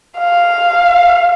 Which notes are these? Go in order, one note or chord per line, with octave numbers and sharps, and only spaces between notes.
F5